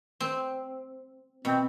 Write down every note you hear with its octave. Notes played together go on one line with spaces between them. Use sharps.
C4
B2 C4